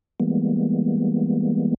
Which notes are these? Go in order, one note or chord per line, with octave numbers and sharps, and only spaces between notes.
E3 G3 G#3 A#3 B3